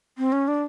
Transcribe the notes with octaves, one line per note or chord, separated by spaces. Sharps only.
C4
C#4
D4